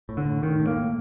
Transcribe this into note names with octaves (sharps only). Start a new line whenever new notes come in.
A2
D3
A2
A2 D#3
A2
A#3
A2